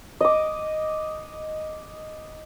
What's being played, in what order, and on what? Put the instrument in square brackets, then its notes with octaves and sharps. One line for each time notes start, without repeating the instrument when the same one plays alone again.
[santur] D#5 D6